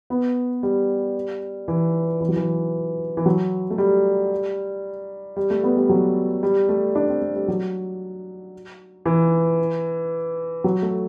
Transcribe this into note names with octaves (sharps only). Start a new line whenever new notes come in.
B3
G3
E3
E3
F#3
E3
E3
F#3
A3
G3
G3
A3
B3
G3
F#3
G3
A3
D4
C4
A3
G3
F#3
E3
F#3
A3